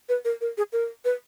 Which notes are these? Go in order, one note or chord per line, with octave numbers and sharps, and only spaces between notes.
B4
A#4
A#4
G#4
A#4
B4